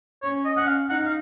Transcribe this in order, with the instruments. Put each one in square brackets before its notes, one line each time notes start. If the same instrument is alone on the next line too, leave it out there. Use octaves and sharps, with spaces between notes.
[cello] C#4 [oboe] C#5
[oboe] D#5
[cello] C#4 [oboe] F#5
[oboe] F5
[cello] D#4 [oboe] F#5
[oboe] F5